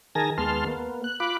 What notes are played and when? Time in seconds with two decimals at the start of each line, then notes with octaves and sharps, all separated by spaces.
0.15 D#3 G#4 A#4 G#5 A5 A#6
0.38 D#2 G#3 B3 A5 C6 F6
0.67 A#3 B3
1.04 F#6
1.20 F4 B5 D6 F#6